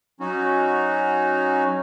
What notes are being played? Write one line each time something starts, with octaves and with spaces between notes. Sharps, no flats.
F#3 C#4 D#4 F#4